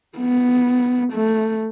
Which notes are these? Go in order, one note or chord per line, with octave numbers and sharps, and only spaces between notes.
B3
A3